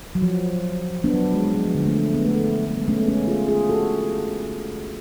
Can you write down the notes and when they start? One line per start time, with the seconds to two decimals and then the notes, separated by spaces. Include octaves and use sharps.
0.15 F#3
0.22 F3
1.04 B3 D4
1.14 F#3
1.25 F#3
1.34 G#3
1.44 G#3
1.55 F#3
1.66 F3
1.75 D3
1.86 A3
2.15 B3
2.26 A3
2.67 A3
2.77 G#3 B3
2.88 A3 C#4
2.97 G#3 B3
3.08 A3 C#4
3.28 F4 G#4
3.48 F4 G#4
3.69 F#4 A4